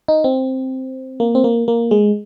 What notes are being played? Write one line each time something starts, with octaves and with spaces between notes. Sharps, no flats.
D#4
C4
A#3
C4
A#3
A#3
G#3